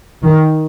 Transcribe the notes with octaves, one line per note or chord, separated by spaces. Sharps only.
D#3